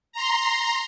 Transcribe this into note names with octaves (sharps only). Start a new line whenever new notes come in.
A#5 C6